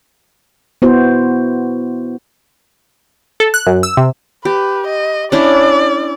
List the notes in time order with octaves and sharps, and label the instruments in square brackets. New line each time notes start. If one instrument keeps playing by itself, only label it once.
[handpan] B3 E4 F#4 C5
[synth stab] A4
F#6
F#2
E6
C3
[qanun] G4 [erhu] B4
[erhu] D#5
[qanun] C#4 D4 E4 [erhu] D5